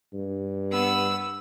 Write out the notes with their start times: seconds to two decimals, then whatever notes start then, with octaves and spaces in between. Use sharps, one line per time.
0.13 G2
0.71 B3 E6